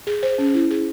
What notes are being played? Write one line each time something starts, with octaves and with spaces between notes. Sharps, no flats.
G#4
C5
C#4
E4
G#4